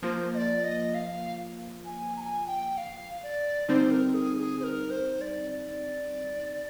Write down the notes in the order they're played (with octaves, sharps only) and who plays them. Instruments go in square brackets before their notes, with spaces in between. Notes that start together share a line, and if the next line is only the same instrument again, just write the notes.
[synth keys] F3 A#3 F4 [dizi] C5
[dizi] D#5
D5
D#5
F5
G#5
A#5
G#5
G5
F5
D5
[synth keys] D3 G3 C4 D#4 [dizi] C5
[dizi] A#4
G#4
G#4
C5
A#4
C5
D5
D5